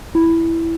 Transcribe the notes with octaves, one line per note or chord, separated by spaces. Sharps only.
E4